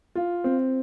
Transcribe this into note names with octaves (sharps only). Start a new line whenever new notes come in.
F4
C4